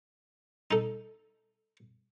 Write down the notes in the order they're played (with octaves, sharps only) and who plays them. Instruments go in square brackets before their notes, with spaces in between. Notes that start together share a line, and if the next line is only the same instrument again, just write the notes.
[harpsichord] D#4 A4